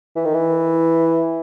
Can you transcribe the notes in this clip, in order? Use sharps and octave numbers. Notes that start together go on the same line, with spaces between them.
E3
D#3
E3